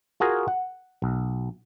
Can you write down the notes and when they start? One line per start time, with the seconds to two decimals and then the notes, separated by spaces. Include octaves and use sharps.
0.20 F4 F#4 G#4 A#4
0.48 F#5
1.02 B1